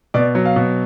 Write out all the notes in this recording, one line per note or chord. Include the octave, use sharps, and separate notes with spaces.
B2 D5
F#3
F5
B2